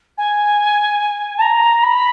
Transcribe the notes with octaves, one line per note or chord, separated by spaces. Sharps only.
G#5
A5
A#5
B5